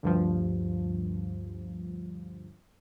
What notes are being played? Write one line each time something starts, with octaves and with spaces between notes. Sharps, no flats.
D2 G2 F3